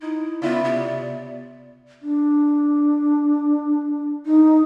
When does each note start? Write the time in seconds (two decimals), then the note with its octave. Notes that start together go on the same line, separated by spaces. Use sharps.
0.02 D#4 E4
0.42 C#3 B3 E4 F4 D5
0.64 C3 B3
2.02 D4
4.26 D#4